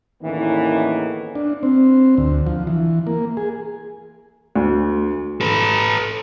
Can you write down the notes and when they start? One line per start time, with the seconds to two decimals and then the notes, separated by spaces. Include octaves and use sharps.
0.22 E2 A2 D#3 E3 A#3 C#4
1.35 D4
1.63 C4
2.17 D2
2.47 F3
2.67 E3
3.07 A#3
3.37 G#4
4.56 D2
5.41 A4 B4